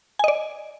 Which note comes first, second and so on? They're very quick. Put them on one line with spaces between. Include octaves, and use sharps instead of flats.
G#5 D#5 D5